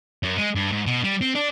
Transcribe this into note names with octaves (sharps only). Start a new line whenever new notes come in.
F#2
G#3
G2
G#2
B2
G3
C4
D4